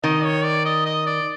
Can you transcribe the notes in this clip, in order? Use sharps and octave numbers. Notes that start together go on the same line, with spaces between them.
D#3 D#5
C#5
D5
D#5
D#5
D5